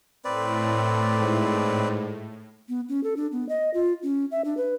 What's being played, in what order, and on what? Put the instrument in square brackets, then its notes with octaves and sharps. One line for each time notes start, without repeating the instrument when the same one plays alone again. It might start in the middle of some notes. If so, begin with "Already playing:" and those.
[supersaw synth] A2 [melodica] C4 B4 D5
[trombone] G#2
[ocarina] B3
C#4
A4
D4
B3
D#5
F4
C#4
E5
D4
B4